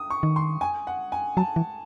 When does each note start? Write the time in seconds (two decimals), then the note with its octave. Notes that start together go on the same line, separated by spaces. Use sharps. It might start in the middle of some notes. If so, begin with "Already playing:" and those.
Already playing: D#6
0.10 C#6
0.23 D#3
0.36 C6
0.61 G#5
0.87 F#5
1.12 G#5
1.37 F#3 A5
1.56 E3